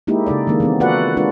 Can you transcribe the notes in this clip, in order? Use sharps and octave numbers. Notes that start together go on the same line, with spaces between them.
G#3 A#3 D#4 E4 G4
C#3 D#4 A4 D5
D#3 G#3 A#3 D4
E3 B3 C4
F4 F#4 A4 B4 D5 F#5
G#3 D4 F4 B4